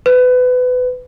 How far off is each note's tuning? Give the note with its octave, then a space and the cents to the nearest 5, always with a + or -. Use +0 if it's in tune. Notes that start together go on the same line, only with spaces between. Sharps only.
B4 +25